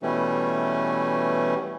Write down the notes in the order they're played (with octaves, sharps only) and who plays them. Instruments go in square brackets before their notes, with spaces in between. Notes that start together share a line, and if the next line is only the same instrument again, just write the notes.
[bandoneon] B2 E3 G3 A3 C#4